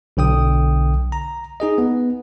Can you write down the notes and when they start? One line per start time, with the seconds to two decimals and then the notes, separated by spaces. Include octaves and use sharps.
0.17 B1 D3 G5 D#6
1.12 A#5
1.60 D#4 G#4 D#5
1.78 B3